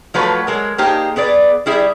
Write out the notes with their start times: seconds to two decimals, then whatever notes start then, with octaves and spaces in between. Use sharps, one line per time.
0.14 F3 F#3 A3 B4
0.47 F#3 G#3 A#4
0.78 A#3 D#4 G4 G#4 C5
1.16 B3 G#4 B4 D5
1.66 G3 E4 G#4 E5